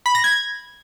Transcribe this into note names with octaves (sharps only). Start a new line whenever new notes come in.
B5
A#6
G#6